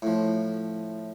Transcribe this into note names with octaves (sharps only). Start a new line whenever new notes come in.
A2 F3